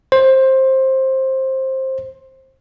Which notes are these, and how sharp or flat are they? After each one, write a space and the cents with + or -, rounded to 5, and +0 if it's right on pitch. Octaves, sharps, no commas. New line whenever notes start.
C5 +15